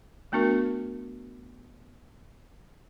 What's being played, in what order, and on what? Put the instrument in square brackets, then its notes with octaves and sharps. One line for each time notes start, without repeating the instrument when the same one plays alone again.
[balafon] A3 B3 D4 F#4 A#4